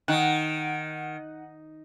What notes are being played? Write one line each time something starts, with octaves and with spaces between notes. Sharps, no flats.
D#3 D#4 F#5